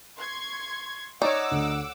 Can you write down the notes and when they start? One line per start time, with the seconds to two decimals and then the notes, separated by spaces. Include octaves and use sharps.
0.17 C6 C#6 G#6
1.22 D#4 C#5 D5 F#5 D6 E6
1.51 D2